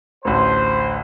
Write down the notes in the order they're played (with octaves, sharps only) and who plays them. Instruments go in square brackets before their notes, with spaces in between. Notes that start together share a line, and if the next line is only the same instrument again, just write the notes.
[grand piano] A1 D2 [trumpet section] C5